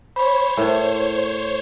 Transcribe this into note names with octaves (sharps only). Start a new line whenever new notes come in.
C5 C#5 B5
A2 A#4